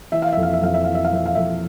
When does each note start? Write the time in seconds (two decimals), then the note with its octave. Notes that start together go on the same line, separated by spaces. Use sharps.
0.12 E3 E5
0.22 F5
0.33 F2 E5
0.43 F5
0.53 E5
0.62 F2 F5
0.74 E5
0.84 E3 F5
0.95 E5
1.05 F5
1.12 F2 E5
1.26 F5
1.35 F2 E5